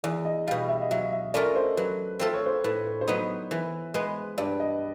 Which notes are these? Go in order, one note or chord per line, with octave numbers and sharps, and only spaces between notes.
E2 D5
D#5
B2 G3 F5
E5
D#5
F#3 E5
E5
A3 C#4 F4 A#4 D5
C5
F#3 B4
A3 C4 F4 A4 C5
C#5
C5
A2 B4
B4
C5
F#3 B3 D#4 B4
E3 B4
G#3 B3 B4
G2 D5
D#5